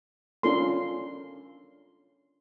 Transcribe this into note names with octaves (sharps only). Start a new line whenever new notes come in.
C#4 D4 F4 A4 A#4 C6